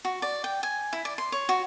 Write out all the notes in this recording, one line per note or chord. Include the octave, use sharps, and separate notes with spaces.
F#4
D5
G5
G#5
E4
D5
C6
C#5
F#4